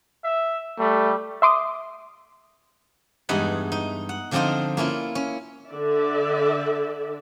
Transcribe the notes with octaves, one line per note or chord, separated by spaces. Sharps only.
E5
G3 A3
E5 C6 D6 D#6
E2 G2 G#3 D#4 F#5 B5
D#4
F#5
D3 F3 C4 D4 D#4 F4
A#3 C#4 E4 F4
C#4
D3 D5 E5